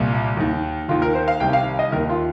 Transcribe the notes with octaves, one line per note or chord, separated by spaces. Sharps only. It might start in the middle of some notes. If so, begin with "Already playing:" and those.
Already playing: C2 A#2
D#2 D#3
D#2 D#3 F4
A#4
C5
F5
C2 C3 D#3 G5
F5
D#5
D#2 D#3 A#4
F4